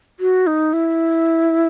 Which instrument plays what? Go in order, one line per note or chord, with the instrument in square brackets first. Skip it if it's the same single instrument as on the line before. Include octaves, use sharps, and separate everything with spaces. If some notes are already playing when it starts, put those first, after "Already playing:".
[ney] F#4
D#4
E4